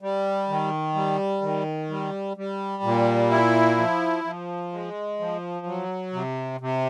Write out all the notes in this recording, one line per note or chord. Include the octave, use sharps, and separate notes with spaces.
G3
D#3
G3
D#3
G3
G3
A#2
E4
F3
F3
G#3
F3
F#3
C3
C3